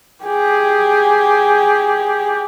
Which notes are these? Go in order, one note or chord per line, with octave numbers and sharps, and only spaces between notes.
G4 G#4